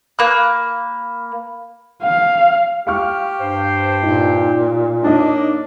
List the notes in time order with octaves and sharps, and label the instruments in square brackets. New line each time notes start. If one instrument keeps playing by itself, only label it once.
[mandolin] A#3 F#6 [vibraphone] B5
[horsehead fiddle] F5
[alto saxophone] G4 [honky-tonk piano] F5 C#6 F6
[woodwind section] G2 C5
[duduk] A#2 [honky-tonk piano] D#4
[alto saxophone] A#3 [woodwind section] D4 [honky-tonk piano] D#4 C#5 D#5